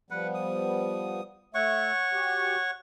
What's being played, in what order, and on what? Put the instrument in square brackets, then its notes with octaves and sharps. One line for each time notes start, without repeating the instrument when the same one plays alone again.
[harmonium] F3 G3 B3 [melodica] B4 F#5
[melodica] D#6
[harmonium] A3 E5 [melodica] C#5 F#5 C#6
[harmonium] F#4 G4